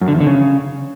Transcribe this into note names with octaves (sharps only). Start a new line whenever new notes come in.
F#2
D3
E2
D3
C#3